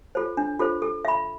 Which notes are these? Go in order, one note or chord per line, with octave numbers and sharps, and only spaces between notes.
F4 A4 C5
D4
F4 A4 C5
A4
E5 B5